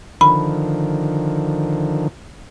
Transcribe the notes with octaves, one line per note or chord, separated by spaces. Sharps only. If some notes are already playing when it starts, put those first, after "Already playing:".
D3 D#3 F3 B5